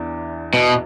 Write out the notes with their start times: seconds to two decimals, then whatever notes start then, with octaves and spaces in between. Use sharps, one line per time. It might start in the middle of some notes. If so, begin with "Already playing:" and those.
Already playing: E2 E3 D4
0.54 B2